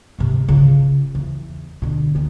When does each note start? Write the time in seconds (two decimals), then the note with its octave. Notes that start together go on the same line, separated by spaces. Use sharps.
0.19 G#2 C3
0.48 C#3 F4
1.15 E2
1.82 B2 D3
2.15 D2 D#3